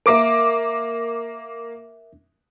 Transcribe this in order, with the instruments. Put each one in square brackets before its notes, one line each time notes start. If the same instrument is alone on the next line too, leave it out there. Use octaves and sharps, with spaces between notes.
[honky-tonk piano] A#3 D6 D7 [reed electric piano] A#4 E5